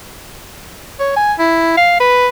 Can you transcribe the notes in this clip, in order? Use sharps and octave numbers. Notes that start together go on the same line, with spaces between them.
C#5
G#5
E4
F5
B4